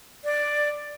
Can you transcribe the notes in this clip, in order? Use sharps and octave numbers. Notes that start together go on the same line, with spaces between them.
D5